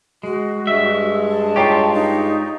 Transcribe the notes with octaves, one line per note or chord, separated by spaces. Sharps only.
G#3 F#4
G2 G#3 E5
A5
F4 G4 C#5 G5 A#5
D#4